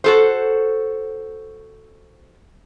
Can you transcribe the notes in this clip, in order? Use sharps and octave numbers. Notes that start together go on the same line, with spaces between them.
F#4 A4 C5